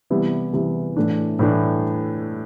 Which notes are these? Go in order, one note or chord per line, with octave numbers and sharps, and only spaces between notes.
C3 E3 G3 B3 E4
C3 E3 G3 B3 E4
A2 E3 A3 D4
A2 E3 A3 D4